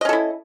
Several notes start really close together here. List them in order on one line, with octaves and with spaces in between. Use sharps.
D#5 C#4 A4 E4